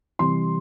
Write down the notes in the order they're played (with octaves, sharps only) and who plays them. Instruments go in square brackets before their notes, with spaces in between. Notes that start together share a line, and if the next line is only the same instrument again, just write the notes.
[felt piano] C3 E3 G3 C6